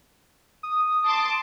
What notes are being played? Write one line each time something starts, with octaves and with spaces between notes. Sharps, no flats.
D#6
A5 C6 D6